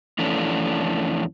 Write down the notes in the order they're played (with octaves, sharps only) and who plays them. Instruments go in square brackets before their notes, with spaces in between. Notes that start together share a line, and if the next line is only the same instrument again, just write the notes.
[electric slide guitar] F2 E3 A3 C#4 D4